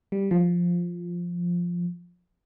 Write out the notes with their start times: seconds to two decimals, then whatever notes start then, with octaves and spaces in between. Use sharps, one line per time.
0.12 G3
0.31 F3